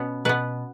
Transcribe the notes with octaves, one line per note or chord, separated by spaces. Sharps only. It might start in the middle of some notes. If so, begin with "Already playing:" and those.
Already playing: B2 B3 C#4
B2 B3 B4